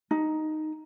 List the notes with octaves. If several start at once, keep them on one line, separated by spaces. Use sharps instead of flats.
D#4